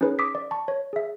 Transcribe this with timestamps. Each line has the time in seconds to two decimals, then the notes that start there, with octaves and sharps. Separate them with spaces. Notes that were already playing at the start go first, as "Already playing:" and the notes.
0.01 C#4 D#4 G#4 B4 C#5
0.19 D6 D#6 B6
0.35 D5
0.51 A5 C#6
0.68 C#5
0.93 G#4 E5